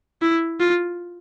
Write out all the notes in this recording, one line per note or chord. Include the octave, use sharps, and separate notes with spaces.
E4
F4